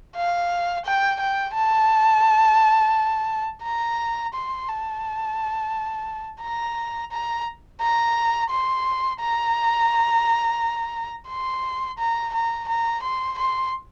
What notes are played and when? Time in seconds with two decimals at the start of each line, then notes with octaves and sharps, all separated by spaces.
0.16 F5
0.85 G5
1.20 G5
1.55 A5
3.64 A#5
4.34 C6
4.68 A5
6.42 A#5
7.12 A#5
7.81 A#5
8.51 C6
9.20 A#5
11.29 C6
11.99 A#5
12.33 A#5
12.68 A#5
13.03 C6
13.38 C6